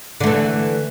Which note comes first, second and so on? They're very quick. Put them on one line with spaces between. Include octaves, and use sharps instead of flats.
D3 A3 E3